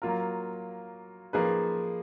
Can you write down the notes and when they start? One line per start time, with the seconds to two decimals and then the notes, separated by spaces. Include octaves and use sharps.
0.02 F#3 A#3 F4 A#4
1.33 F3 A#3 D#4 G#4 B4